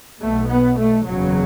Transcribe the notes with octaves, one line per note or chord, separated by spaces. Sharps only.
B1 B2 A3
B3
A3
F#1 E2 C#3 F#3